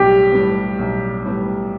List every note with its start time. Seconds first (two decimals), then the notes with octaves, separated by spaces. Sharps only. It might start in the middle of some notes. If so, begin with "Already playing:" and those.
Already playing: B1 A2 G3 B3 G4
0.32 A2 G3 B3
0.79 B1
1.24 A2 G3 B3